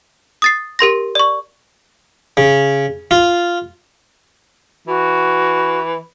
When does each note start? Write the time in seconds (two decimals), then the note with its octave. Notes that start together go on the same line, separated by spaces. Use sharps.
0.42 D#6 A6 C7
0.79 G4 A#4 C6 A#6
1.15 D5 C#6
2.37 C#3
3.11 F4
4.87 E3 F#4